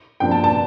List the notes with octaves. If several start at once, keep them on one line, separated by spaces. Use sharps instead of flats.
G2 F3 A#3 G5
A5
A5